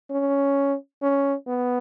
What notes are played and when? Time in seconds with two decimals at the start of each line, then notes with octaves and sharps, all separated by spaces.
0.11 C#4
1.02 C#4
1.48 B3